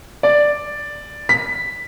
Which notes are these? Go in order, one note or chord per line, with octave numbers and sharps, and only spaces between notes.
D5
B6